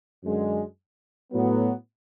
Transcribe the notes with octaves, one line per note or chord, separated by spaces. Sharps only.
F#2 D3 G#3
A2 F#3 B3